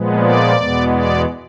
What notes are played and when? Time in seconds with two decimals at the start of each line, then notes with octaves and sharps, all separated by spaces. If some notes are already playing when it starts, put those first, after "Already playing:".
Already playing: A#2 F3 G#3 B3
0.22 D5
0.56 E2 B2 G#3 B3
0.91 D5